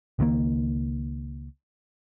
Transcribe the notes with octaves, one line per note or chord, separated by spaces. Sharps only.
C#2 D#3 G#3 A#3